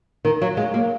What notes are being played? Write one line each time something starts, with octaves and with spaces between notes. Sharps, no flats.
D#3 A#4
F#3 F5
G#3 F5
A#3 A#4